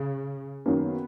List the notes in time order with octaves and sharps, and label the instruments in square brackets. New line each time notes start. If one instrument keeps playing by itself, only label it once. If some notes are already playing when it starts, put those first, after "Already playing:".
Already playing: [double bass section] C#3
[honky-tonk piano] F#2 D#3 A#3 C#4 [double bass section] B3